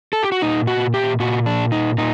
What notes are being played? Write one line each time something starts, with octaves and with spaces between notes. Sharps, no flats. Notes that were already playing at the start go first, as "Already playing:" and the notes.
A4
G4
F#4
A#2 D#4
F#4
G4
A#2 F#4
D4
D#4
A#2 D#4